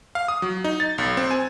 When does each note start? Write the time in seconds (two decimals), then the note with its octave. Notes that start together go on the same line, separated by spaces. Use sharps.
0.15 F5
0.28 D#6
0.42 F#3
0.64 D#4
0.80 A6
0.98 B1
1.17 C4
1.31 G#5